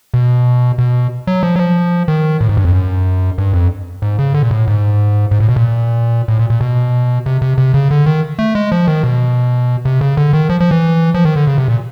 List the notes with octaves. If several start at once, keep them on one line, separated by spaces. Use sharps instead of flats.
B2
B2
F#3
F3
F#3
F3
D#3
A2
G#2
G2
F2
F#2
G2
F2
G#2
C#3
D3
A#2
A2
G#2
G#2
A2
B2
A#2
A2
A#2
A#2
B2
C3
C3
C3
C#3
D3
D#3
A3
G#3
F3
D#3
B2
C3
C#3
D3
D#3
F3
F3
E3
F3
D#3
D3
C#3
C3
A#2